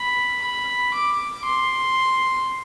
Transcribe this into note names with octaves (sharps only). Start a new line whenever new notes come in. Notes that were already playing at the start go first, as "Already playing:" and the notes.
Already playing: B5
B5
D6
C6